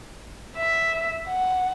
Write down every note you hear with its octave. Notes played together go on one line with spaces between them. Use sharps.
E5
F#5